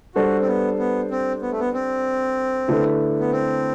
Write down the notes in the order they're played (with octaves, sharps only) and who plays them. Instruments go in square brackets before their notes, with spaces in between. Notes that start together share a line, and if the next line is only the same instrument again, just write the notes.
[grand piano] G3 D4 A4 C5 [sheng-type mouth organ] F#4
[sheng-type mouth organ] C4
B3
B3
C4
B3
A3
B3
C4
[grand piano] D3 A3 E4 B4
[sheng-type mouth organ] B3
C4